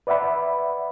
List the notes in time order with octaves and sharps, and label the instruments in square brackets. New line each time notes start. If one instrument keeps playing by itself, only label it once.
[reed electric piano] B4 D5 E5 F#5 B5